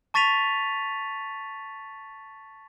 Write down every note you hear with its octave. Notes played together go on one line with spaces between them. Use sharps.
A5 C#6 A6 B6 D#7 F7